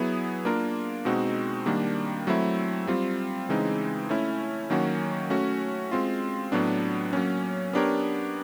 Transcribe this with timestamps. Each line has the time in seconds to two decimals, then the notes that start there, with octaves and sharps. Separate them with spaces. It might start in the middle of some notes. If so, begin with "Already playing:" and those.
Already playing: F#3 B3 E4 G#4
0.45 A#3 D4 F4 A#4
1.05 B2 G#3 C4 D#4 F#4
1.66 D#3 G3 A#3 D4
2.27 F#3 A3 C4 E4
2.87 G3 C4 F4
3.49 C#3 E3 G#3 C4 D#4
4.09 A3 C#4 E4
4.70 D#3 F#3 A#3 C#4 F#4
5.30 A3 C#4 F#4
5.92 G#3 C4 F4
6.52 A2 F#3 B3 D4
7.13 F#3 A#3 C#4
7.73 B3 D4 G4 A#4 C#5